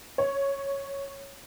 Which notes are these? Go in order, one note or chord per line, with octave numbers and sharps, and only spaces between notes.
C#5